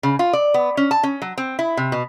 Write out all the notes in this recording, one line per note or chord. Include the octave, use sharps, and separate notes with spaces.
C#3
F4
D5
B3
C#4
A5
C#4
F#3
C4
E4
C3
B2